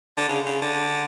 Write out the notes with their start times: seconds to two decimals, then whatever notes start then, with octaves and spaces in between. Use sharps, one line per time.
0.17 D3
0.29 C#3
0.46 C#3
0.62 D3